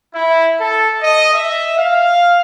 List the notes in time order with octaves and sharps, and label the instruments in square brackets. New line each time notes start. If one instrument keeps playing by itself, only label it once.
[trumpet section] E4
A4
D#5
E5
F5